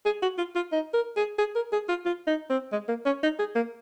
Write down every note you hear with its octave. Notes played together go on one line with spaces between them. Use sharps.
G#4
F#4
F4
F4
D#4
A#4
G#4
G#4
A#4
G#4
F4
F4
D#4
C4
G#3
A#3
C#4
D#4
G#4
A#3